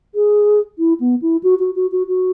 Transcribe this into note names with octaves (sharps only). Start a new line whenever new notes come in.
G#4
E4
B3
E4
F#4
F#4
F#4
F#4
F#4